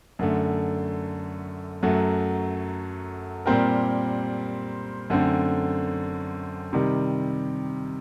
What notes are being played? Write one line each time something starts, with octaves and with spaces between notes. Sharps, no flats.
F#2 D3 A3
F#2 F#3 A3
A#2 G3 C4 G4 A#4
F#2 D3 A3 C4
C3 D#3 G3